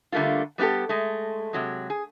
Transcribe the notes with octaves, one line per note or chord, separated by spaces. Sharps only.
D3 G3 A3 A#3 F4
G3 B3 D#4 G4 A4
G#3 A3
C3 F#3 G#3
G#4